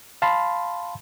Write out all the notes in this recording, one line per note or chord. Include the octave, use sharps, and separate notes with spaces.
F5 A5 B5 C6